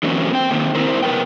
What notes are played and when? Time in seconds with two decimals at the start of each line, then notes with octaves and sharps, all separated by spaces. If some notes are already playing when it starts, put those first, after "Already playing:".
0.03 D3 E3 F#3 A#3 C4 C#4
0.33 C4 G5
0.51 D#3 A#3 C4 D#4
0.75 C4 E4 A#4 C5
1.03 C3 B3 A#4 B4 G5